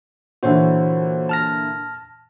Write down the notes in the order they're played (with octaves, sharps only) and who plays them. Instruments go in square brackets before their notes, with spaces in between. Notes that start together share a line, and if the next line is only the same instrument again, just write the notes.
[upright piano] A#2 D3 E3 [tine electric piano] F#4 C5 C#5
[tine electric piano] A5 F6 A#6